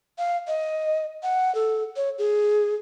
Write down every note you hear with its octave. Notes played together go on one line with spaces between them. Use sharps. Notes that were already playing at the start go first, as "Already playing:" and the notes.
F5
D#5
F#5
A4
C#5
G#4